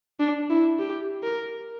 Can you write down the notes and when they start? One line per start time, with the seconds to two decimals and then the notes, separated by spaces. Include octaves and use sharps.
0.20 D4
0.50 E4
0.79 G4
1.23 A#4